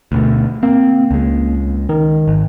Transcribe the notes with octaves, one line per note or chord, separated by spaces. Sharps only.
D2 B2 A3
A#3 C4
C#2 G#3
D#3
G#1